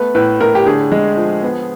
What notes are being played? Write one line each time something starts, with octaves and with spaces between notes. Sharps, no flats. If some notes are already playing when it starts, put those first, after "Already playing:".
Already playing: A3 B3 B4
A2 B4
A2 A#4
G4
D3 G#4
G#3
F3
B3